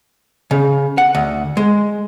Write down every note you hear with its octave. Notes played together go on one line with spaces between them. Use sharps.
C#3
F#5
D2
G#3